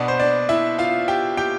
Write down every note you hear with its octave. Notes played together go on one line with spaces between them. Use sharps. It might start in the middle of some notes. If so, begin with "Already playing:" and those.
Already playing: B2 B3 D4
C5
D4 D5
E4 E5
F4 F5
G4 G5
G4 G5